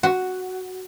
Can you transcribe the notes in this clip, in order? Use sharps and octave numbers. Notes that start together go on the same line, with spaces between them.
F#4